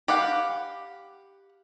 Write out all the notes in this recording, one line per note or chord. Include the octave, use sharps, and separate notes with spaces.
G4 B4 F5 F#5